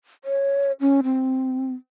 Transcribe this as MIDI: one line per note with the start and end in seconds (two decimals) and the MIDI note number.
0.24 0.72 73
0.81 1.01 61
1.04 1.73 60